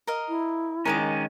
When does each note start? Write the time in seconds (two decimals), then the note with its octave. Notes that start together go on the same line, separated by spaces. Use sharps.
0.07 A#4 D#5 F5
0.29 E4
0.85 D#3 G#3 C#4 A#4 D#5 D6